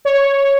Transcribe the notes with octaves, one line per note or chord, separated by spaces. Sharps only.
C#5